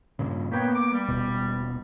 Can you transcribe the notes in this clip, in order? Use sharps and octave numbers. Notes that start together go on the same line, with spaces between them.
G2 A#2 C#3
A#3 B3 B4 C#5 G5
D6
G3
D#1 B2